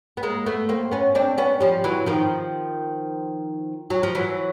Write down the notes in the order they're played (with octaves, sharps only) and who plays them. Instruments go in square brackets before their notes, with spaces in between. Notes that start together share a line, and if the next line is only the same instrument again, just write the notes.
[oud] B3
G#3 A#3
A3 B3
A#3 C4
B3 C#4
C4 D4
B3 C#4
F3 G3
E3 F#3
D#3 F3
F#3
F3
E3 F#3